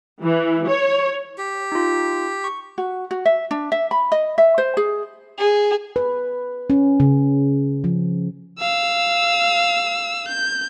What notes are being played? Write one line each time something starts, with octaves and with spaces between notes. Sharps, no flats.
E3
C#5
G4
D#4 F4
C#6
F#4
F#4
E5
D4
E5
B5
D#5
E5
C5
G#4
G#4
B4
C#4
C#3
F3
F5 E6
G6